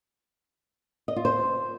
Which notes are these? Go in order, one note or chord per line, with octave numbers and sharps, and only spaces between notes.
D#5
F4
C5